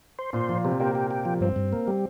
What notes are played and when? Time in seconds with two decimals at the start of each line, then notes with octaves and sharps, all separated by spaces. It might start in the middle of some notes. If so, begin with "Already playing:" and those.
0.19 C5
0.33 A#2 C5
0.49 A#2 F3
0.64 C3 C4
0.80 A#3 G4
0.95 G4
1.11 G4
1.25 F3
1.41 G2 C4
1.56 G2
1.73 A#3
1.88 G3